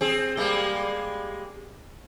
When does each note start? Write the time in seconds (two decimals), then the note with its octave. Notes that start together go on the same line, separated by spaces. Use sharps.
0.01 C4 G#4
0.37 G3 G#3 A#3